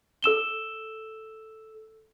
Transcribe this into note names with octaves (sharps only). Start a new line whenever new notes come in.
A4 E6 E7 G7